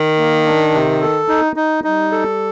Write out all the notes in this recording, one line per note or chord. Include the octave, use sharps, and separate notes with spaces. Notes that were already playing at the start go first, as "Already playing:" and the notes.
Already playing: D#3
A#3
D4
C3
A4
D#4
D#4
G3 D#4
A4